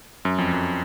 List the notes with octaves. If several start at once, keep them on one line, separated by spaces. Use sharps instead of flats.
F#2
F2
F#2